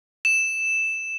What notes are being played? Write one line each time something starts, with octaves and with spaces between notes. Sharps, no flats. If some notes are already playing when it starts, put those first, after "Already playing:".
E7